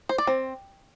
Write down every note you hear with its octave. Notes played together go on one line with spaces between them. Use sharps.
C5
D5
C4